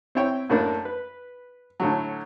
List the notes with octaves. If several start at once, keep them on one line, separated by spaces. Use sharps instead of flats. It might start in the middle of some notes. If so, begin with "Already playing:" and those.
C4 E4 C#5 G5
F#2 A2 A#3 D4
B4
A2 D3 F#3